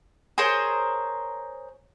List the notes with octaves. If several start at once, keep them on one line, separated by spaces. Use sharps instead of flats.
G#4 A#4 C5 C#5